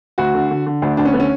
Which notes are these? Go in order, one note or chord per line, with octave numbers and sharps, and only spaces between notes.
D2 F#4
D3
D3
D3
D2 D4
D2 D4
C#4
D3 B3
C#4